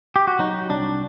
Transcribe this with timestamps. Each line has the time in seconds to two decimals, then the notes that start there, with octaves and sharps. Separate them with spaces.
0.16 G4
0.27 F#4
0.39 F#3 D#4
0.69 C2 D4